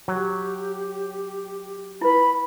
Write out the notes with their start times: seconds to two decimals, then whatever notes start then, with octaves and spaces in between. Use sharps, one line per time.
0.08 F#3 G4
2.01 E4 B4 B5